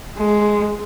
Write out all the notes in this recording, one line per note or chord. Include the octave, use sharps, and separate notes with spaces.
G#3